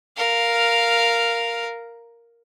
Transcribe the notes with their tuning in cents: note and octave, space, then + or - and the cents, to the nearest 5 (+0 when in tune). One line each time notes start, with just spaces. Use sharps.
A#4 +0 F5 +0